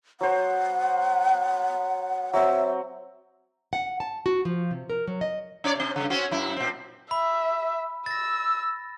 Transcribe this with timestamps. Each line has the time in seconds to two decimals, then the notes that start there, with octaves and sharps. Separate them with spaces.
0.21 F#3 C5 F#5
2.34 F#3 C4 E5
3.73 F#5
4.00 A5
4.26 F#4
4.45 F3
4.71 C3
4.90 A#4
5.07 F#3
5.21 D#5
5.64 C#4 C#5 D5
5.75 C3 C4
5.96 G2 C#3
6.10 C4 C#4 F#4
6.31 F#2 E4
6.56 A#2 C4
7.11 E5 B5
8.06 E6 A6 A#6